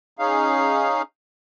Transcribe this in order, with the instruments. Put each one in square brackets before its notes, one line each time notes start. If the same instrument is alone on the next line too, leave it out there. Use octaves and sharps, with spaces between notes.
[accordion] C#4 D#4 G#4 F5